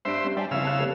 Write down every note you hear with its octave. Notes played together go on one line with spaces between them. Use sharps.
G2 D4 C5 E5 D7
G3 C#4
G3 D5 G#5 A5
F2 C#3 E4 F5 E6
C#4 A5 F#6
G3 A3 B3